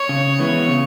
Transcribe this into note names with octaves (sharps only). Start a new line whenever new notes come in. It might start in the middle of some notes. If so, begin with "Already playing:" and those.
Already playing: C#5
C#3
E3 G#3 B3 E4
C#3